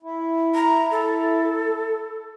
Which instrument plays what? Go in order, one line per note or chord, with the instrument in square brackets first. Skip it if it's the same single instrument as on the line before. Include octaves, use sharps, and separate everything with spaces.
[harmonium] E4
[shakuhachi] A#5
A4